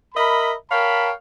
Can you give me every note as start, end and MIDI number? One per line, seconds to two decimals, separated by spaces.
0.15 0.54 70
0.15 0.54 75
0.15 0.54 76
0.15 0.54 83
0.71 1.11 70
0.71 1.11 73
0.71 1.11 77
0.71 1.11 79
0.71 1.11 81
0.71 1.11 83